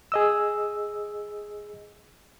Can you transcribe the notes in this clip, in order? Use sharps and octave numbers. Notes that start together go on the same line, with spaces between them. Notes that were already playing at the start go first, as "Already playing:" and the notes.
G#4 D#5 E6